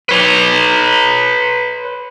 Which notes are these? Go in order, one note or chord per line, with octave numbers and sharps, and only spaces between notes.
B4 C#5